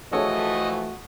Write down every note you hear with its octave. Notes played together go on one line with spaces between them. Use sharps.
E3 F3 A3 F#4 G#4 A4 C#5 D#5